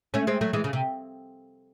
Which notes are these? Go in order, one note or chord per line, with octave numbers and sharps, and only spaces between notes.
A3 C#4
G#3 C4
F#3 A3
E3 G#3
C#3
C3